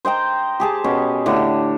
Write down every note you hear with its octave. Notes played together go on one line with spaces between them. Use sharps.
C5 D#5 G5 A#5
G4 G#4 A5
B2 C#4
A2 D3 D4